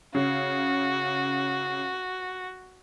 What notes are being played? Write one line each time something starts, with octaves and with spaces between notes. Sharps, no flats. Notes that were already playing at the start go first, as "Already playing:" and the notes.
C#3 F#4